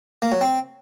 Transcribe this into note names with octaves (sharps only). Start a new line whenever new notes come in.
A#3
F#3
C4